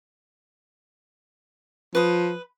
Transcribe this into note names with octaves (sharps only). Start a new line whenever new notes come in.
F3 B4 D#6